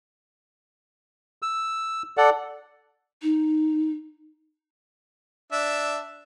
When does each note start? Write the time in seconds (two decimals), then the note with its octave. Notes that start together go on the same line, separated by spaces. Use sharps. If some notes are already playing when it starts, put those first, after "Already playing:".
1.42 E6
2.17 A4 D5 F#5
3.23 D#4
5.52 D4 E5